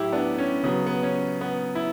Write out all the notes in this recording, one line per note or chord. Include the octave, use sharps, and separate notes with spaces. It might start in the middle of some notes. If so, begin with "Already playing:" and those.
Already playing: A2 F#3 E4 G4
B3 D4
C#4
C#3 F#3 B3
B3
C#4
B3
E4